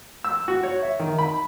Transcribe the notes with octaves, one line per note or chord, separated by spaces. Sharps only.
E6
F#4
C#5
E5
D#3
B5